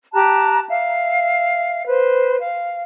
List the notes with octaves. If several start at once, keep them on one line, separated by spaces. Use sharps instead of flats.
G4 A5 A#5 F#6
E5 F5
B4 C5
F5